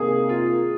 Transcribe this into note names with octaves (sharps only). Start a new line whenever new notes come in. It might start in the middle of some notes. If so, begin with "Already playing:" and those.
Already playing: C3 D#3 A#3 G#4
F4